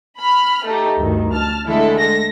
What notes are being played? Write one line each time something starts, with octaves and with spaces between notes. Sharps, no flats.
B5 F6
A3 D#4 G4
D2 G2 D#3
A5 F6
D3 G#3 A3 E4 A4
A4 A#6